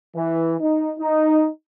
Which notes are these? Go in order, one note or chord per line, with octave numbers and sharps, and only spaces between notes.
E3
D#4
D#4